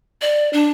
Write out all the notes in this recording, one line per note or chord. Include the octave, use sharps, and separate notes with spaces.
D5
D4